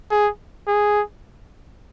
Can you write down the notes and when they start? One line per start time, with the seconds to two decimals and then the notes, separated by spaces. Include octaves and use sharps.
0.11 G#4
0.67 G#4